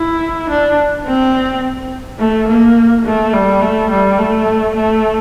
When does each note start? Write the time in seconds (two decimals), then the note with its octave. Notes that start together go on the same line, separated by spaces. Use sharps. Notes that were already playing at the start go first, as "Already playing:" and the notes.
Already playing: E4
0.50 D4
1.06 C4
2.19 A3
2.48 A#3
3.05 A3
3.33 G3
3.61 A3
3.90 G3
4.18 A3
4.75 A3